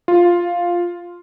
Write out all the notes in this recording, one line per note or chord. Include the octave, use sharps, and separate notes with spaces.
F4